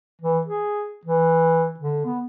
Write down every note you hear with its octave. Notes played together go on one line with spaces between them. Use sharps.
E3
G#4
E3
D3
B3